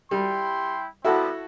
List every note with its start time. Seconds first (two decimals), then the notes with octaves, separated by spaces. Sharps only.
0.11 G3 E4 G5 C6
1.04 G3 B3 C4 E4 F#4 A4